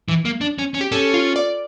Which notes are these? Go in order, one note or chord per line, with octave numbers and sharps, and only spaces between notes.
E3
A#3
D4
C#4
C#4
G4
C#4 A4
F4
D5